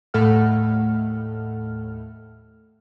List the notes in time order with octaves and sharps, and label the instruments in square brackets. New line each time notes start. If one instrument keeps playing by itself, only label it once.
[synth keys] D#2 A2 A3 A4 F#5 F6